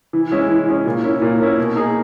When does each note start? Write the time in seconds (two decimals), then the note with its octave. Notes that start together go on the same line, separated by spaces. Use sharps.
0.13 E3
0.32 G#3 C#4 E4
0.49 E3
0.67 G#3 C#4 E4
0.85 A#2
1.03 A#3 C#4 E4
1.22 A#2
1.40 A#3 C#4 E4
1.58 B2
1.76 A#3 D#4 G#4